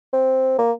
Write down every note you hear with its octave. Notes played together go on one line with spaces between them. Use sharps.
C4
A#3